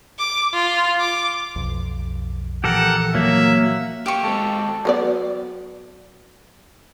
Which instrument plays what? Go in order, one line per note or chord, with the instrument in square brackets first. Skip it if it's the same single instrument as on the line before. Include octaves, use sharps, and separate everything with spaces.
[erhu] D6
F4
D6
[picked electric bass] B1 F2
[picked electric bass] A#2 E3 F3 [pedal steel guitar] G4 A4 A#4 [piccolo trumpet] F#5
[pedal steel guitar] F#3 A#3 [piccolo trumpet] E5
[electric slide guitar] A#3 [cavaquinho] G4 C#6
[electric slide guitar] G#3 C4 [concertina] A4
[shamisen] F#3 B3 D5